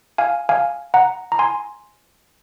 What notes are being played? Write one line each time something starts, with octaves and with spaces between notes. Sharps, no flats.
F5 G#5
F5 G#5
F#5 A#5
A#5
G#5 C6